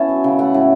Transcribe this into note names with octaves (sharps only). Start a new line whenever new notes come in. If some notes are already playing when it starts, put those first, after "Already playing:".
Already playing: B3 C#4 E4 C#5 A5
F#3
C#3
A3 F#5
A2